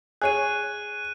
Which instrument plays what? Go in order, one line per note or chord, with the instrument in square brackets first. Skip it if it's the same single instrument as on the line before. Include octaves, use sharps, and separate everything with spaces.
[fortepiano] G#4 C#5 [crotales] F#6 D#7